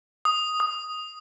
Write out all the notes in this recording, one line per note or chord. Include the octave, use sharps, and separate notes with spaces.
D#6
D#6